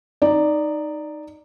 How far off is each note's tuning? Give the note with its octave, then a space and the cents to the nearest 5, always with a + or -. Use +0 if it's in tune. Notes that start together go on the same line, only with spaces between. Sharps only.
D#4 -10 D5 +0